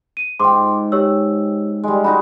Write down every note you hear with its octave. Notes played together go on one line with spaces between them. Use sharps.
D#7
G#2 G5 C6 D6
G4 C#5 E6
G3 G#3
G#3 D#4 F#4 B5